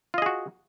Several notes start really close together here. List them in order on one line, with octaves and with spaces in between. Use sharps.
F4 D#5 G#4 F#4